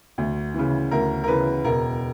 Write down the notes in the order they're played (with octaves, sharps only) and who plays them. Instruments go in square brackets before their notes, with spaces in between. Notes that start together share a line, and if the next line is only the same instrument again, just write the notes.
[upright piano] D2
C#3 E3
D2 A#4
A#4
C#3 E3 B4
E1 A#4